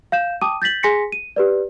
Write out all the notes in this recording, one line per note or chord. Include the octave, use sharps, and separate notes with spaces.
F5 G6 E7
G5 A5 D6 D#6 D#7
G6 A6 B6 F#7
G#4 G#5 C6 A#6 B6 C#7
D#7
G4 B4 D5